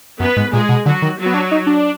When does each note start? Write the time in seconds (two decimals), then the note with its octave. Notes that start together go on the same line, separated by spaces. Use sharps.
0.20 F#2 B3 B4
0.37 G#2
0.53 A#2 G#3 G#4
0.69 B2
0.86 D3 F#3 F#4
1.02 D#3
1.18 F#3 F#4
1.26 B3
1.34 D4
1.51 D#4
1.67 D4